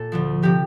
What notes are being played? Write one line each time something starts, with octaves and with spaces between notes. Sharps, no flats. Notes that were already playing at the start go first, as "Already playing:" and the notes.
Already playing: A#2 A4
D2 D3 F3
C3 F3 G4